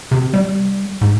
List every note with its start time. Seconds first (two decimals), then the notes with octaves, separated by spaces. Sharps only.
0.11 C3
0.33 G3
1.01 G#2